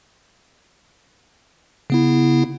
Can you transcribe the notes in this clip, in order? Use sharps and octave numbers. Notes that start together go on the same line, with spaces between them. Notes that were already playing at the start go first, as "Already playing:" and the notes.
C#3 B3 E4